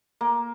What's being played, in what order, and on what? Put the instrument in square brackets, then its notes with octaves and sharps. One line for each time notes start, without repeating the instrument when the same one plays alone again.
[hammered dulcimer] A#3